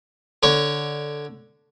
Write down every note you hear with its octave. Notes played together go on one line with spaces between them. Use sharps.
D3 C#5